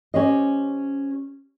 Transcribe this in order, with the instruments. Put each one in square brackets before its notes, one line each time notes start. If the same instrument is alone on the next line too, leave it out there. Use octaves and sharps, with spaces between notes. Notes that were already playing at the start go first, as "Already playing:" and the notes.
[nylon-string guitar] C#4 G4 C5 D#5